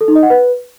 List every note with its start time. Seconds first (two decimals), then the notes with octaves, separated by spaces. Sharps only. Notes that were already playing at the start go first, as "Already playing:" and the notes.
0.01 A4
0.08 D#4
0.15 D#5
0.23 F#5
0.30 B4